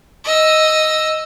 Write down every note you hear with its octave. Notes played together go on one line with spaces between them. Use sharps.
D#5 E6